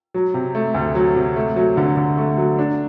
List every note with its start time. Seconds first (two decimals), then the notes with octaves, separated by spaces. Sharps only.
0.14 F#3
0.34 C3
0.55 A3
0.74 D2
0.95 F#3
1.16 C3
1.36 A3
1.56 F#3
1.77 D3
1.96 D3
2.17 A3
2.37 F#3
2.59 D4